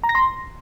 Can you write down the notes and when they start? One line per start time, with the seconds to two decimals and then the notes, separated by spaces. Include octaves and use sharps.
0.04 A#5
0.09 A#6
0.15 C6